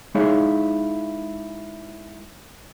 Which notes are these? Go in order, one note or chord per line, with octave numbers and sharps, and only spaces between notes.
G#3 D#4 E4 G#4 C#5 F5